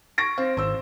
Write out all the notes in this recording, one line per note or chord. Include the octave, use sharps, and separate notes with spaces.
C#6 A#6 D7
C4 F5
G#1 C5 E6